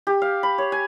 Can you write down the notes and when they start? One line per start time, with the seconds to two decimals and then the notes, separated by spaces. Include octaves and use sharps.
0.07 G4
0.22 F5
0.43 B5
0.58 C#5
0.72 G#5